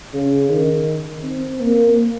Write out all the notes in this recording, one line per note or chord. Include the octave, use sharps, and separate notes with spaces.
C#3
D#3
C4
A#3